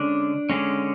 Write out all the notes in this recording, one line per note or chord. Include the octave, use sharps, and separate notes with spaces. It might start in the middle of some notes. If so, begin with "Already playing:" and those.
Already playing: D3 G#3 C#4 D4
D3 G#3 C#4